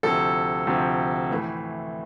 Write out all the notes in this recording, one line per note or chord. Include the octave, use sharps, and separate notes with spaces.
D2 C3 F3 A4
D2 C3 F3
A2 E3 A3